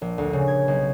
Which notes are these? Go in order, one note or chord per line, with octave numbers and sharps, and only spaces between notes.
A#1
D2
C#3
G#6
B1